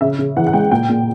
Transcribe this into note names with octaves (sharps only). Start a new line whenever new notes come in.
C#3 E5
C#3
E3 F#5
F#5
G#3 G5
A#2 G5
A#2